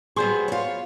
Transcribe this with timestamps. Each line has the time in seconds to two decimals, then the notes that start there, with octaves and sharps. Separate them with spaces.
0.16 F#3 G3 B3 G#4 C5 C6
0.48 F4 C#5